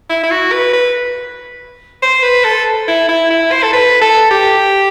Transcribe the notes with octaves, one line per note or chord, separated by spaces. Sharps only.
E4
E4
F#4
B4
B4
C5
B4
A4
E4
E4
E4
C5
A4
B4
A4
G4